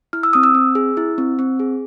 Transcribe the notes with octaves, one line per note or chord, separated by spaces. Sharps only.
E4 F6
E6
C4 D#6
E6
C4
G#4
E4
C4
C4
G#4